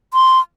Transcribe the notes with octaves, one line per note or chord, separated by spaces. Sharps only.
C6